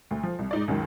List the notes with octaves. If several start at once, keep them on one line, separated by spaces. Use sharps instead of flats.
D2
F3
C2
G#2 D#4 D5
C#2 F#2 D#3 F#3